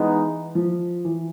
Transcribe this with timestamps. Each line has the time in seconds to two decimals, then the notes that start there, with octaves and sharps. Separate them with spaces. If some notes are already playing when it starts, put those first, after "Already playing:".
Already playing: E3 G#3 B3 D#4
0.55 F3
1.05 E3